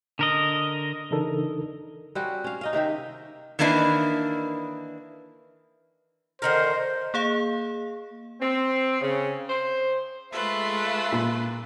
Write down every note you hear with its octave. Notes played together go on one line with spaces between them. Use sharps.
D3 A#4 D#5
C#3 E3 D4 D#4 A4 A#4
G3 C4 C#4 F#4
C#4 F5
D#4 D#5 F5
C3 D#3 G4 E5
D#3 E3 A#3 D4 E4 B4
D3 D#3 A#4 C5
A#3 G#4 F5
C4
C#3
C5
G#3 A3 F4 B4 E5 C6
A#2